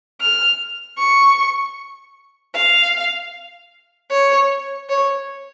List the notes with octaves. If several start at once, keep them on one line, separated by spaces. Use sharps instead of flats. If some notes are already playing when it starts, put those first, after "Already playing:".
F6
C#6
F5
C#5
C#5